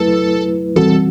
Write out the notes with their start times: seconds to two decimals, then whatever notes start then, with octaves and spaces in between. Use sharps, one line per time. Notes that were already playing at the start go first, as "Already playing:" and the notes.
Already playing: F#3 A3 E4 A4 B4
0.76 E3 G3 C4 F#4 A4